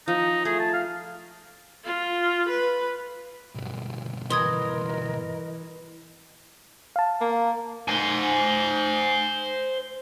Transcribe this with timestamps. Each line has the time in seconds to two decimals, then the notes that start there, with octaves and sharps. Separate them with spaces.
0.08 F3 D#4
0.45 A3 G#4
0.59 A5
0.74 F5
1.85 F4
2.49 B4
3.55 B1 G2
4.30 E3 A#4 D#5 C6 D#6 G#6
6.96 F5 A5
7.21 A#3
7.88 C5 G#5